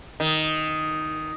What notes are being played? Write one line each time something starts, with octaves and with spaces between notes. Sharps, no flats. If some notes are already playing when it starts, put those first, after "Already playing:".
D#3